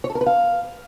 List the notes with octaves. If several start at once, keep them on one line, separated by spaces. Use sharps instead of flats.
C#5
A4
A#4
B4
F5